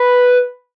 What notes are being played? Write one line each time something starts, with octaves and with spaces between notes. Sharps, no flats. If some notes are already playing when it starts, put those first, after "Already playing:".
Already playing: B4